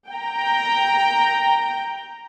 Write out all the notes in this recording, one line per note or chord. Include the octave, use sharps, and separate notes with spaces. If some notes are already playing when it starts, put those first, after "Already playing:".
G5 A#5